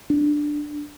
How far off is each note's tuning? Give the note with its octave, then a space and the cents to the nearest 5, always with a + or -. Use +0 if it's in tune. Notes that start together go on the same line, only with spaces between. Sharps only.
D4 +10